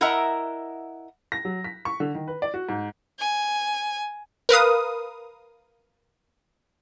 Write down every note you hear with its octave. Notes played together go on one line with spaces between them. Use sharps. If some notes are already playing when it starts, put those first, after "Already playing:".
E4 A#4 D#5 E5 F#5 A#5
A#6
F#3
B6
C#6
D3
D#3
B4
D5
F#4
G#2
G#5
A#4 B4 F5 D#6